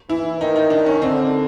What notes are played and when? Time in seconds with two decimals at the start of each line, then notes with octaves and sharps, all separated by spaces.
0.10 E3 E4
0.40 D#3 D#4
0.56 D#4
0.70 D#3 D4
0.86 C#4
1.02 D3 C4